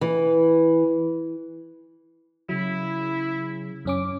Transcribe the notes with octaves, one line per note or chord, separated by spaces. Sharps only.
E3
C#3 F#3 E4
F#2 C#4 D6